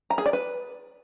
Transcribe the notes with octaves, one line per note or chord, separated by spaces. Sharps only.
A#5
G#4
D5
B4